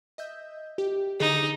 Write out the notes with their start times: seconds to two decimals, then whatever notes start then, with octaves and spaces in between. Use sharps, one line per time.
0.18 D#5 E5 G6
0.78 G4
1.20 D3 D#4 G#4